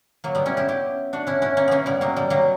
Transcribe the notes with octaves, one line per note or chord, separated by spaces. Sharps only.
F#3 A#3
G3 B3
C#4 E4
E4 G4
E4 G4
D4 F#4
C#4 E4
C#4 E4
A#3 C#4
A#3 B3 C#4
G3 B3
F#3 A#3
G3
F#3 A#3